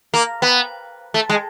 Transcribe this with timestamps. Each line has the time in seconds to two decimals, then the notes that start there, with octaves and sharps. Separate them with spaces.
0.14 A#3
0.42 B3
1.14 A3
1.30 G#3